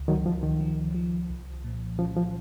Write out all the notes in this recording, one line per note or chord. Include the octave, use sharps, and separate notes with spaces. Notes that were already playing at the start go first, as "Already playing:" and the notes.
Already playing: C#2
D#3 F#3
C#2 F3
D#3
F3
F3
C2
A#2
F3 C#4
F3